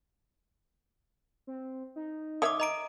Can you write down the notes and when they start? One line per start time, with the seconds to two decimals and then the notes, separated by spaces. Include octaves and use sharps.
1.47 C4
1.96 D#4
2.42 D#3 C#5 E5 D6 D#6
2.60 D#5 A#5 D7